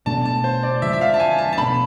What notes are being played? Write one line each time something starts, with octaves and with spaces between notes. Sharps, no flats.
B2 A3 D4 A5
A5
C5
D5
D3 F3 G#3 E5
E5
F5
A5
G#5
A5
A5
B2 A3 D4 B5